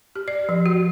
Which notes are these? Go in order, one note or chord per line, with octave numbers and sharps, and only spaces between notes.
G4
D5
F3
F#4